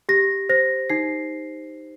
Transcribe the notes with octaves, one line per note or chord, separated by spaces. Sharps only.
G4 A#6
C5 A#6
D#4 C7